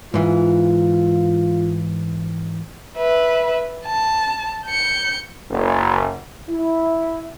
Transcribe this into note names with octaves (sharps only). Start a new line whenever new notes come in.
G#2 E3 F4
B4 E5
A5
G6 C#7
F#1
E4